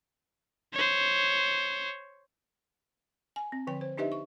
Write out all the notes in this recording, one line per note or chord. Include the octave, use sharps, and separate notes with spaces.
C5 C#5
G#5
C4
D3 F3 G5
C5
D4 D#4 G4 B4 D#5 E5
C#6